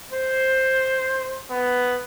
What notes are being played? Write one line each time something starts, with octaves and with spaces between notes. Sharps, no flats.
C5
B3